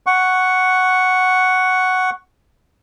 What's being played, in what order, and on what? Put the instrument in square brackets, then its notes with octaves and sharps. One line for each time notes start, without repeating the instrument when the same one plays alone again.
[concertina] F#5 C#6